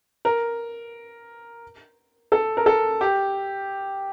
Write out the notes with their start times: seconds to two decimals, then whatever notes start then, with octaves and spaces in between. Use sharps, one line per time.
0.25 A#4
2.32 A4
2.57 A#4
2.66 A4
3.01 G4